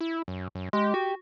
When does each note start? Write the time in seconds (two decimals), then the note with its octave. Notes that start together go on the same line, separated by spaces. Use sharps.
0.01 E4
0.28 F#2
0.55 F#2
0.73 G#3 G4
0.94 F#4